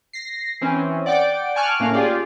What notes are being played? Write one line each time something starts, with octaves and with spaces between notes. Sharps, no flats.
A#6 C7
E3 C4 C#4
D5 F#5 G5 D6 D7
G#5 A5 C#6 D6 F6 F#6
A2 A#3 C#4 F5
F4 G4 G#4 D5